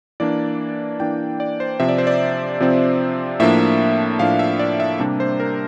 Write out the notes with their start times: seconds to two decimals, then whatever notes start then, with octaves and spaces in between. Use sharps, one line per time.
0.20 E3 A#3 D4 D5
1.00 E3 A#3 D4 G5
1.40 D5
1.60 C5
1.80 C3 F3 C4 E5
1.89 D5
1.98 C5
2.07 D5
2.60 C3 F3 C4
3.40 A2 F3 A#3 D4 E5
4.19 A2 F3 A#3 D4 F5
4.39 E5
4.59 D5
4.80 E5
4.99 C3 G3 A#3 D4
5.20 C5
5.40 A#4